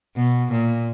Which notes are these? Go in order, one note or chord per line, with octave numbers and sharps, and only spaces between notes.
B2
A#2